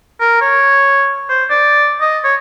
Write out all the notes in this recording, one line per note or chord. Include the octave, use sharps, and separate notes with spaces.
A#4
C#5
C5
D5
D#5
C#5